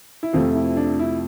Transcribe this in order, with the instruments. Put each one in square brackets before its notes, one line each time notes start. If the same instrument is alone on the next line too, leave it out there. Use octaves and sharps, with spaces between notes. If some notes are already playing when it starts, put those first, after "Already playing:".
[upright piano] E4
F2 C3 F3 A3 F4
E4
D4
E4